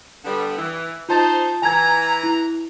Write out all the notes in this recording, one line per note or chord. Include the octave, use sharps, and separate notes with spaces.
D3 G3 B3
E3
D#4 F4 C5 A5 A6
E3 G#5 A#5 G#6
E4